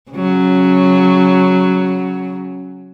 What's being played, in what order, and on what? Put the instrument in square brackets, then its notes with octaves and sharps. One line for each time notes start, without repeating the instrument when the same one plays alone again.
[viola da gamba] C#3 F#3